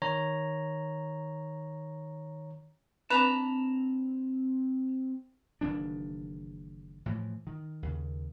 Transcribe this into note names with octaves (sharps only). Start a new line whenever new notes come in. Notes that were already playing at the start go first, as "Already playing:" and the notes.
D#3 C#5 A#5
C4 D4 B4 A5 A#5
F#1 D#3 E3 D4
A2 E3 F3
D#3
D#2 C#3